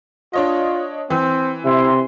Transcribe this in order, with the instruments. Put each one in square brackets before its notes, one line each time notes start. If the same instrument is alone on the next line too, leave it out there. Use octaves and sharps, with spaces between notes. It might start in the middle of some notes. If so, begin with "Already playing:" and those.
[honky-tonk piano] D4 C#5 D#5 [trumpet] F4
[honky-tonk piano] E3 [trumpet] C4
[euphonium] C3 [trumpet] E4 [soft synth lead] C6